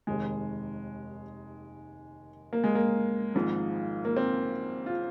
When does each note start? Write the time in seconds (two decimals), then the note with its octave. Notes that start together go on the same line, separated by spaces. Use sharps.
0.07 F1 D#2 D#3 G#3
2.53 A#3
2.64 G#3
2.75 A#3
3.35 G#1 G#2 F3
4.05 A#3
4.17 C4
4.86 F4